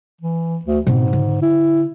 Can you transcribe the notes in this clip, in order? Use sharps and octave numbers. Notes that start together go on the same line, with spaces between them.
E3
D2
G#2 B2 C4
D3
E4